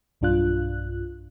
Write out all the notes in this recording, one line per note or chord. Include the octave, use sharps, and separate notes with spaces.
B1 G2 D4 F4 F#6